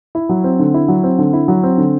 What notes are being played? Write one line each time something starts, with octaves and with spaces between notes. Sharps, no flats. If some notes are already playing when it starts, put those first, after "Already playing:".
E4
F#3
C4
D3
E4
F#3
C4
D3
E4
F#3
C4
D3